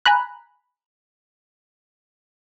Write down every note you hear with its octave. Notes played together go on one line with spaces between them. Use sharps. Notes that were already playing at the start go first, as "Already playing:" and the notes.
G#5 A#5 B5 F#6